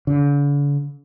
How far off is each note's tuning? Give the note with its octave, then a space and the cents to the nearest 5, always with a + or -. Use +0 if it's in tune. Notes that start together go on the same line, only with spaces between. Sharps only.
D3 -45